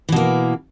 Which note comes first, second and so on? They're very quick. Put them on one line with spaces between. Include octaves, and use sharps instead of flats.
E3 B2 A#3